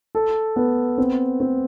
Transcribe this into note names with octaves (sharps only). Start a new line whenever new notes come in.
A4
B3
C4
C4